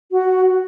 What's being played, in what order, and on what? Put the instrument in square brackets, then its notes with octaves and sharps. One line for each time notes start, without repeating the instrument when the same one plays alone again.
[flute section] F#4